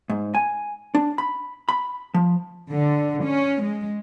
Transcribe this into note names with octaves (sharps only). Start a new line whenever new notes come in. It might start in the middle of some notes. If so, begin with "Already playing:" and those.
G#2
G#5
D4
B5
B5
F3
D3
C#4
G#3